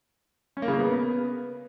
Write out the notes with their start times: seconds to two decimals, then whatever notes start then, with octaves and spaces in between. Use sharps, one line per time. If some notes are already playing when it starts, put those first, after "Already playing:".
0.57 C#4
0.62 A#3
0.68 C#3
0.73 A#3
0.79 B3